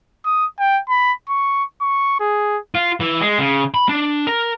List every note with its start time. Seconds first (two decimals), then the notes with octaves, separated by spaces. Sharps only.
0.25 D#6
0.59 G5
0.89 B5
1.29 C#6
1.81 C#6
2.20 G#4
2.75 F4
3.00 E3
3.21 G#3
3.38 C#3
3.74 B5
3.89 D4
4.27 A#4